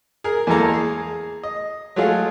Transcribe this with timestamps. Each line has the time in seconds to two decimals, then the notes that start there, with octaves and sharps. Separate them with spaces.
0.24 G#4 A#4
0.47 E2 E3 G#3 A#3 A4 A#5
0.74 G#4
1.43 D#5
1.96 F#3 G#3 A3 F4 G#4